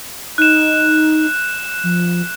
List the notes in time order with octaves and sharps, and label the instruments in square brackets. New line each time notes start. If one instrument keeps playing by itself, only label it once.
[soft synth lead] D#4 [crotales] F#6 E7
[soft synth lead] F3